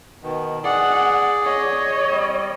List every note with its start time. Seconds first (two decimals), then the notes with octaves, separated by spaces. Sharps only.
0.23 B2 D#3
0.64 G#4 D5 F#5
1.43 C#5 D#5
2.10 G3